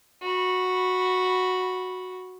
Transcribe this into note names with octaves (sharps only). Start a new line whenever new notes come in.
F#4 B5